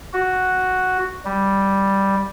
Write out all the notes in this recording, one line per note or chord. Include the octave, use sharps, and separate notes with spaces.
F#4
G3